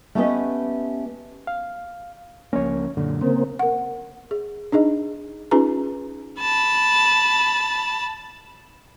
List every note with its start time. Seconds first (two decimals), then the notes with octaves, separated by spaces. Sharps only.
0.15 A3 B3 C#4 G4 B4 D#5
1.47 F5
2.53 C#2 F3 A#3 C#4 C#5
2.97 F#2 A#2 D3
3.21 C#3 A#3 C4
3.59 A#4 F#5
4.31 G#4
4.72 D4 D#4 G#4 D#5
5.51 C#4 D#4 F4 G#4 B4 A#5
6.40 A5 B5